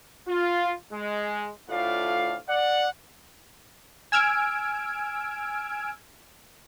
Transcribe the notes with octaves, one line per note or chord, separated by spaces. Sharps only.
F4
G#3
D2 A2 F4 D5 F5
D5 F#5
G#5 E6 F6 G#6 D7